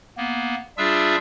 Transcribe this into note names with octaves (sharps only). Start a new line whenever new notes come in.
A#3 B3
G3 D4 F4 G#4 E5 E6